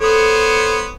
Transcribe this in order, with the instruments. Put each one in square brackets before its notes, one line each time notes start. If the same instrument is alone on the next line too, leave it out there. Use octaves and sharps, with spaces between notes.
[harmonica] B3 C5 C#5 [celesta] A4 D#6